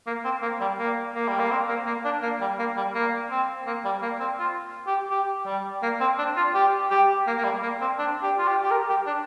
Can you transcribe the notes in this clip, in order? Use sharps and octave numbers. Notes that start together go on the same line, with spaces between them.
A#3
C4
A#3
G3
A#3
A#3
G3
A#3
C4
A#3
A#3
D4
A#3
G3
A#3
G3
A#3
C4
A#3
G3
A#3
C4
F4
G4
G4
G3
A#3
C4
D4
F4
G4
G4
A#3
A#3
G3
A#3
C4
D4
G4
F4
G4
G4
A#4
G4
D4